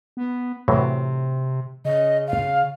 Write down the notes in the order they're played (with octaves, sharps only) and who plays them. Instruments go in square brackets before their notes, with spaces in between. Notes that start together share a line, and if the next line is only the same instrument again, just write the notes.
[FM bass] B3
[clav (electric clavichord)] A2 E3 F#3 [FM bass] C3
[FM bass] C#3 [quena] D#5
[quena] F5